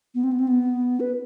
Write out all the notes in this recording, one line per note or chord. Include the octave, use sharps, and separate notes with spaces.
B3
C4
B3
C4
B3
B4